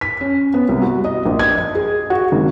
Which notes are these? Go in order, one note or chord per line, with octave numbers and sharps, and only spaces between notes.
B6
C#4
B3
C2
F#4
D#5
A#1
G#6
D#5
G#4
F#4
G#1